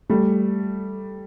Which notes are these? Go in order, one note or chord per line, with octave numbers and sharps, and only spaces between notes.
G3 A3